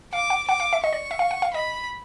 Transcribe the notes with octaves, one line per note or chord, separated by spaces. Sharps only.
F5 D6
F#5
F#5 D6
F5
E5
D#5 C#6
D5
E5
F5
F#5
F5
D#5 B5